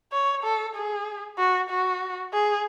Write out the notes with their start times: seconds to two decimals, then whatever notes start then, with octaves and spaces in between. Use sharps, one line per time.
0.13 C#5
0.44 A4
0.76 G#4
1.38 F#4
1.70 F#4
2.33 G#4